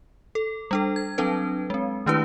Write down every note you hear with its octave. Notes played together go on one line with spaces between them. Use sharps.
A4
G3 D4 A4
G#6
F#3 C4 D4 A4 B4
G#3 C4
D#3 A3 D4 E4 G4 B4